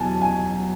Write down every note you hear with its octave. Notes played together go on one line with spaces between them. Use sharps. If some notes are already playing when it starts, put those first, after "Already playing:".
Already playing: E2 B2 F#3 G#5 A5
G#5